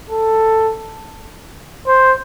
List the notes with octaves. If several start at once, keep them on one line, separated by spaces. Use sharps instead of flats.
A4
C5